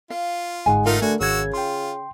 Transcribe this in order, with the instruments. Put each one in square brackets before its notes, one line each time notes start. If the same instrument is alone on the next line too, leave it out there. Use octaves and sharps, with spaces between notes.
[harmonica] F4 [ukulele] F5
[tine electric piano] G1 G#2 F#5 [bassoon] G#3 [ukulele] G#5
[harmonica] A3 D#4 F5 [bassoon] F4 [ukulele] A#4
[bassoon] D3 [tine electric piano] A3 [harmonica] F#4 G#5
[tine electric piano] G#1 G#6 [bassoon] C#3 [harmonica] F#4 E6
[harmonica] F4 [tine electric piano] G5 C6